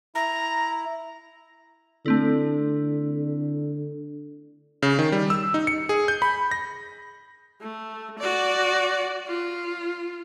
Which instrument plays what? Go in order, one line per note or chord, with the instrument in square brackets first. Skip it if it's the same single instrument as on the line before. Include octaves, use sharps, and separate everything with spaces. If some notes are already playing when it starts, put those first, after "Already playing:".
[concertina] E4 [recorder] A#5
[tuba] D3 [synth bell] A3 C4 E4
[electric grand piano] C#3
D#3
G3
E6
D#4
C#7
G#4
G6
B5
A#6
[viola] A3
F#4 D5
F4